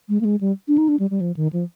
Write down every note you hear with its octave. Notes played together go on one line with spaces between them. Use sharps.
G#3
A#3
G#3
G3
D4
D#4
D4
G3
G3
F3
D#3
F3